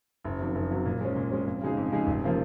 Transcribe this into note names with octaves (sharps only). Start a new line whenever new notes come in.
F#1
F2 D#3 F#3
F#1
F2 D#3 F#3
A#2
G#3 C#4
A#2
G#3 C#4
F2
C#3 G#3 D#4 G#4
F2
C#3 G#3 D#4 G#4
F1
C#3 F3 A#3